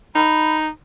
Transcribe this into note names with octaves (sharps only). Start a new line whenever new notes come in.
D#4 B5